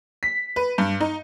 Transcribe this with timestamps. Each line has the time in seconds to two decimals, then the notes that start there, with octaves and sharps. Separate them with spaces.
0.23 B6
0.56 B4
0.78 G2
1.00 D#4